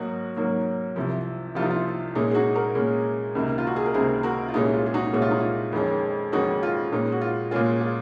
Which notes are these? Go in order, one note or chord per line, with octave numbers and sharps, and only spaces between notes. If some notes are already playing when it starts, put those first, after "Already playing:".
Already playing: G#2 F#3 A#3 D#4 F#4
G#2 F#3 A#3
C2 C3 F3
C2 C3 F3 F4
D#4
F4
A#2 G#3 C#4 D#4
G#4
D#4 F#4
F#4 A#4
A#2 G#3 C#4
C#2 C3 D#3 A#3
F4
F#4
G#4
A#4
C#2 C3 D#3 A#3 G#4 C5
F#4 A#4
F4
C2 A#2 G#3 C#4 D#4
F4
G#4
D#4 F#4
C2 A#2 G#3 C#4 F#4
F4
D#4
F4
F2 D#3 G#3 C#4
F2 D#3 G#3 C#4 D#4 F#4
F4
A#2 G#3 C#4 D#4
F#4
F4
A#2 G#3 C#4 F4 G#4
F4 G#4